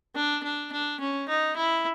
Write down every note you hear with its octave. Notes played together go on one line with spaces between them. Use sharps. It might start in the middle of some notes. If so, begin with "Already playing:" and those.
D4
D4
D4
C#4
D#4
E4